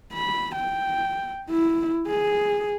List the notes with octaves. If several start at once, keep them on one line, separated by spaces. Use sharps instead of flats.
B5
G5
E4
G#4